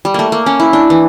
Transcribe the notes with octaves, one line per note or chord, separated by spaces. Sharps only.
G3
A3 A#3
A#3
C#4
E4
D4
E3